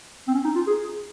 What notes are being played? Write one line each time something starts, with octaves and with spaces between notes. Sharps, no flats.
C4
C#4
D#4
F4
G#4